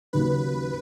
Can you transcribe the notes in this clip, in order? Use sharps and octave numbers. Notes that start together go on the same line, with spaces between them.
D#2 C#3 F#3 A#3 B4